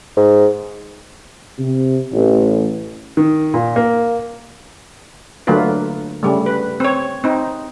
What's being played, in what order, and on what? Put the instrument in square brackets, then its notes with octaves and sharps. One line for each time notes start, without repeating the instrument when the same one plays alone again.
[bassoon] G#2
[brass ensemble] C3
A1
[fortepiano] D#3
A#2
A#3
[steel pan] D3 F#3 A3 A#3 F4 B4
C#3 G3 A3
B4
C4 C#5
C4 D#4